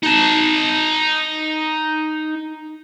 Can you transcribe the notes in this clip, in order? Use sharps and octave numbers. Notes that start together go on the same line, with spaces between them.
D#4 A5